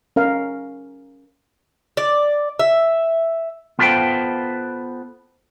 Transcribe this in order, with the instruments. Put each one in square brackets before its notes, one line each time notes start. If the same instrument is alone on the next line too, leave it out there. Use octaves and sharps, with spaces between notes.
[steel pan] C#4 A#4 F5
[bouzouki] D5
E5
[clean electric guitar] B3 F4 A4 B4 C5 G5